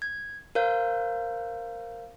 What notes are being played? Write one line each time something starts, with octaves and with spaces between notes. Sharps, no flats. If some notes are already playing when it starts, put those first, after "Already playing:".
G#6
A#4 C5 F5 G6